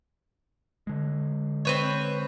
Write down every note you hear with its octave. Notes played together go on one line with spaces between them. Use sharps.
D3 G#3
C4 B4 C#5